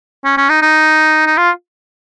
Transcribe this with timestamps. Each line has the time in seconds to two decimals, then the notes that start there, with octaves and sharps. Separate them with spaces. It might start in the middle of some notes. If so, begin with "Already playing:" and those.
0.25 C#4
0.37 C#4
0.50 D#4
0.62 D#4
1.27 D#4
1.37 F4